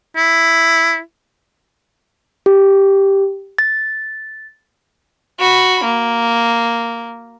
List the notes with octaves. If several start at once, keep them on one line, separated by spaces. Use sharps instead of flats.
E4
G4
A6
F#4 B5
A#3